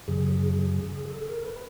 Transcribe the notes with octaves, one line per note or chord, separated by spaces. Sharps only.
F#2 C#3 F#3 G#4
G#4
G#4
A4
A#4
B4